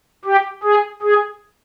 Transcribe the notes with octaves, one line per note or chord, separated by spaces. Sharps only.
G4
G#4
G#4